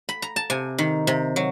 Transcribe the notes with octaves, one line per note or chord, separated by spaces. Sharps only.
B5
A#5
A5
C3 G#5
D#3
C3
F#3